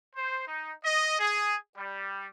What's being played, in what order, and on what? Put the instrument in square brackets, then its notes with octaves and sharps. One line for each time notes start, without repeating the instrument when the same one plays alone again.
[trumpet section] C5
D#4
D#5
G#4
G3